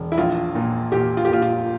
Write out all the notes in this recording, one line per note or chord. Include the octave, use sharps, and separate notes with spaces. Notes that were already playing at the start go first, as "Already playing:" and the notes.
Already playing: E1
E4
A#1 F4
A#2
A#2 G4
F4
G4
A#2 F4
F4